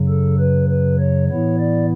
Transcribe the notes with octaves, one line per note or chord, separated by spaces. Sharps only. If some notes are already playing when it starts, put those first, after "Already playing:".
Already playing: F#2 C#3 F#3
A4
B4
B4
C#5
A2 E3 B3 E4 C#5
D5